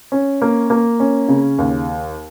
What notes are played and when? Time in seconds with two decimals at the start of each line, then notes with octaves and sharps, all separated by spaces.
0.12 C#4
0.42 A#3
0.70 A#3
1.00 C#4
1.29 C#3
1.58 D#2